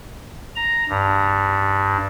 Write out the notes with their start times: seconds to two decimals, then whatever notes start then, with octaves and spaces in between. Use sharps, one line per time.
0.56 A#5
0.89 G2